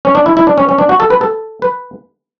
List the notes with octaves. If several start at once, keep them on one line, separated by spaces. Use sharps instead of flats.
C#4
D4
E4
E4
D4
C#4
C#4
D4
F#4
A4
B4
A4
B4